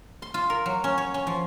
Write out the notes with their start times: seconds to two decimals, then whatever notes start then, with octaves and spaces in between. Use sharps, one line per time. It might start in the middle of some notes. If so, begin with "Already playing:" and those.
0.22 C6
0.34 F4
0.50 A#4
0.66 F#3
0.84 C#4
0.98 C#5
1.14 C#4
1.27 F3